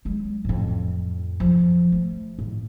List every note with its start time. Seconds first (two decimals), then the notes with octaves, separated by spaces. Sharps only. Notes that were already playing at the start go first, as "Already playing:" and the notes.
0.05 F#3 G#3
0.45 F2 A2
1.40 F3
1.92 A3
2.39 A1